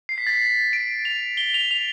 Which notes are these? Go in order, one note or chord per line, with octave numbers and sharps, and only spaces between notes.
C7
B6
A6
B6
D7
F7
G7
F7
F7